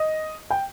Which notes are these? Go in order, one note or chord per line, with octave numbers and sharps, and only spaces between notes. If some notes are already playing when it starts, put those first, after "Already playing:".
Already playing: D#5
G5